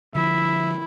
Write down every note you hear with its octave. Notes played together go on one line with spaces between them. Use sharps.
D3 F3 E4 E5